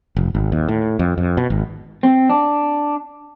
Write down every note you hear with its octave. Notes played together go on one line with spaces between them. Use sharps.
F1
G#1
D#2
A2
F2
F2
B2
G#1
C4
D4